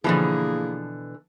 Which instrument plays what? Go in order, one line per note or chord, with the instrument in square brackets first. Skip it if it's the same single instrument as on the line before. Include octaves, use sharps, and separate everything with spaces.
[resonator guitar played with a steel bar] B2 D3 E3 [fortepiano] F3 [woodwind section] A#3 E4 G#4